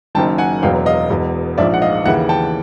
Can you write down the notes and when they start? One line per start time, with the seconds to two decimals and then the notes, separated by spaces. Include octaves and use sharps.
0.15 F#1 F#2 D#3 G5 A5
0.38 F#5 G#5
0.62 E1 E2 B2 F#3 F5 G5
0.86 D#5 F5
1.10 E1 E2 B2
1.58 A#1 G#2 F3 D5 E5
1.74 F#5
1.82 D#5 F5
2.05 D#2 C#3 E3 E5 F#5
2.29 G5 A5